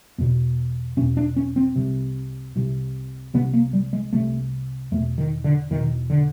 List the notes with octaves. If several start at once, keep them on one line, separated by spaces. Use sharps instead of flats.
E2 B2
E2 B2 C#4
D4
C#4
C4
C2 C3
C2 C3
C2 C3 B3
A#3
G3
G#3
C2 C3 A3
E2 B2 A3
D#3
D3
E2 B2 D#3
D3